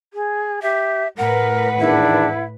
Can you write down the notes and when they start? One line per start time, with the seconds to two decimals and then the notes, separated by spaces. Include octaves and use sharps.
0.13 G#4
0.62 G4 E5
1.18 A2 A#4 B4 F#5
1.79 E2 D#3 D4 E4